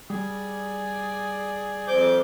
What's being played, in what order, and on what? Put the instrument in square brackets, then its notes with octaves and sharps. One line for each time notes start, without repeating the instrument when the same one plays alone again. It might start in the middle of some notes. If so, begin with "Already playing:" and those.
[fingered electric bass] G3 [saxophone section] G#4 D5
[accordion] F2 D6 G6 [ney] C5